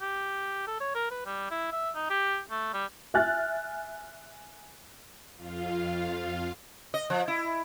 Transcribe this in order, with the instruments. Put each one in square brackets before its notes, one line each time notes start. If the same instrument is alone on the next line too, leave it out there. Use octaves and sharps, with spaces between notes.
[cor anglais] G4
A4
C#5
A#4
B4
G3
E4
E5
D#4
G4
A3
G3
[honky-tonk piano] E5 G#5 F6 F#6 A6
[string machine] F2 F4 F5
[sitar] D#5
F3
E4